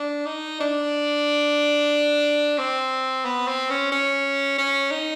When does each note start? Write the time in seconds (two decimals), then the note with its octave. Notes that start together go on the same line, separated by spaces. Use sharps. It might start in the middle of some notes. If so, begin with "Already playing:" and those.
Already playing: D4
0.26 D#4
0.60 D4
2.58 C4
3.25 B3
3.47 C4
3.70 C#4
3.92 C#4
4.58 C#4
4.91 D#4